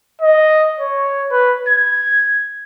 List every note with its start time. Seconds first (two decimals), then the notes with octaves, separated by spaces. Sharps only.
0.22 D#5
0.80 C#5
1.31 B4
1.68 G#6